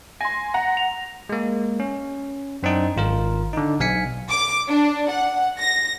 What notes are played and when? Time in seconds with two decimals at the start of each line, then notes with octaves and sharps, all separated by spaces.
0.21 G#5 C6 A#6
0.54 F#5 A#5
0.77 F7
1.29 G#3 A#3
1.80 C#4
2.63 F#2 C4 D4 D#4
2.96 G#1 F4 A#4
3.53 D3 D#4
3.80 B1 F5 G#5 B6 C#7
4.30 D6
4.69 D4
5.12 F#5
5.59 A#6